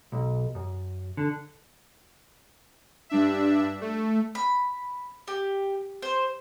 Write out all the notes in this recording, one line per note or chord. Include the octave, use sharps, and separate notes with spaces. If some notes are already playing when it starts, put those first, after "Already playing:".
B1
F#2
D3
G2 D4 E5
A3
B5
G4
C5